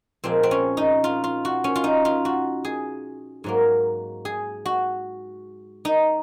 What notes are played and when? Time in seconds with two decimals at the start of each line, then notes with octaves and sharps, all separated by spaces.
0.24 A#2 F3 G#3 C4
0.43 C4
0.51 C#4
0.77 D#4
1.04 F4
1.24 F4
1.45 F#4
1.64 C#4
1.76 F4
1.84 D#4
2.05 F4
2.25 F#4
2.65 G#4
3.44 G#2 F#3 A#3
4.25 G#4
4.66 F#4
5.85 D#4